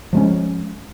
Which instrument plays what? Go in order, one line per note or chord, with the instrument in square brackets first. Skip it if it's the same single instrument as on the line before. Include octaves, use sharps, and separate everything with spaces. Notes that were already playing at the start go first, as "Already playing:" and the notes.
[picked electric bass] F3 G#3 C#4